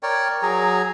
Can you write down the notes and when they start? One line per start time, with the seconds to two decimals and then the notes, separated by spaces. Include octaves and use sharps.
0.03 A#4 C#5 D5 G5
0.42 F#3 G#4 A#5